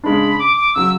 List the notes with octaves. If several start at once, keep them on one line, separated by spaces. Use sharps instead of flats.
C#3 G#3 D4 B5
D6
D6
C#3 F#3 E6